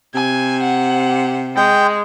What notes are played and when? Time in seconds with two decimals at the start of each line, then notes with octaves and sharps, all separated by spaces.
0.15 C3 G#5
0.63 F#5
1.56 G#3 G5